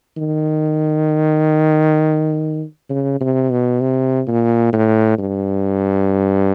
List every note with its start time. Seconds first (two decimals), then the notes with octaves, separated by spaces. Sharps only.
0.17 D#3
2.90 C#3
3.21 C3
3.51 B2
3.81 C3
4.28 A#2
4.73 A2
5.18 G2